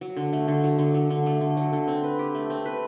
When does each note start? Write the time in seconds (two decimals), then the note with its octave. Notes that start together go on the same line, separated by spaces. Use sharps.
0.01 F#3
0.17 D3
0.33 A3
0.48 D3
0.64 F#3
0.79 D3
0.94 F#3
1.10 D3
1.26 A3
1.41 D3
1.57 F#3
1.73 D3
1.87 C4
2.04 B4
2.19 G4
2.35 A3
2.50 C4
2.66 B4